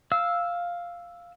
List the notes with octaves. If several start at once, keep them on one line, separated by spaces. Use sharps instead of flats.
F5 E6